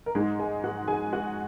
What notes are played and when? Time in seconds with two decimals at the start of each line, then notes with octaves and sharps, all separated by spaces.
0.06 A#4
0.15 G#2 G#3 D#4 G#4
0.39 G#4 G#5
0.64 F#4 F#5
0.88 G#4 G#5
1.13 F#4 F#5